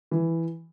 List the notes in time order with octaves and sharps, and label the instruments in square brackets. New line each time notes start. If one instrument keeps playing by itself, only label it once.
[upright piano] E3